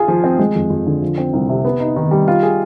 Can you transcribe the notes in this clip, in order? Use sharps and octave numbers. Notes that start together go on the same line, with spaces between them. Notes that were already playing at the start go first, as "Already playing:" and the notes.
Already playing: F4 G#4
F3
C4
G#3
F2
F2
D3
F3
C4
C2
C3
B3
D#4
D#3
G3
F4
G#4